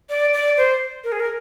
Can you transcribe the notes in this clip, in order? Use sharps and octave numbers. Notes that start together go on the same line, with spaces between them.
D5
D5
C5
A#4
G#4
A#4